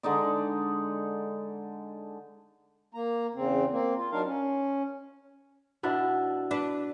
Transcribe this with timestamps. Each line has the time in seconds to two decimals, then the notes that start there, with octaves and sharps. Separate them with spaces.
0.03 D3 G#3 D#4 D5
2.94 A#3 A#5
3.35 E2 C#3 C4
3.71 A#3 C4
3.97 F4
4.12 F#3 D4 D#4 A#4 F5
4.25 C#4
5.83 B2 D4 E4
6.51 D4 B4